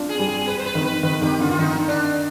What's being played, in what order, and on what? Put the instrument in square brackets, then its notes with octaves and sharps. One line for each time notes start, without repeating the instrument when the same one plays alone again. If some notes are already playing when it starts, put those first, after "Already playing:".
Already playing: [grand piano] D4 F4
[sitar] G#4
[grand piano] G3
[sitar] G#4
B4
C5
B4
[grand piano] D#3
[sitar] B4
[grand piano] D#3 [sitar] B4
[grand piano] D#3 [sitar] G4
[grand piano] D3 [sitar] F4
[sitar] F4
[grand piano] D#3 [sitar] D#4
[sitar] D4